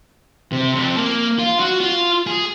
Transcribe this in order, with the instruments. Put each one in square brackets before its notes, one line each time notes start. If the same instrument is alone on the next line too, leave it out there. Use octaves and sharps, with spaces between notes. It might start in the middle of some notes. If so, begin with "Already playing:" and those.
[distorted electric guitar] C3
F2
A#3
F4
F#4
F4
G#4